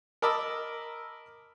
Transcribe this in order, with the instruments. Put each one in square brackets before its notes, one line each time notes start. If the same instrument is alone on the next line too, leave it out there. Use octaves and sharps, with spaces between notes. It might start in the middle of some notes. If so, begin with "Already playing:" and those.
[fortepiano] A#4 D#5 A5 B5 D6 E6